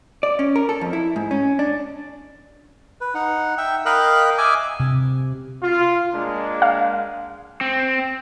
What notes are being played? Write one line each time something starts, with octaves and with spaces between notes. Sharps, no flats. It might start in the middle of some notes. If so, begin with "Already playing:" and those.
D5
C#4
A#4
A4
F2
E4
G#2
C#4
D4
B4
D#4 F#5
E5 G5
A#4 D#5 F5 G5 B5 F#6
D#5 E5 G#5 D6
C3
F4
G#3 A#3 D4
F5
C4